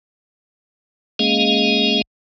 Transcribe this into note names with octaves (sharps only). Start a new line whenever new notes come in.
G#3 A#3 C#4 G#4 D#5 F5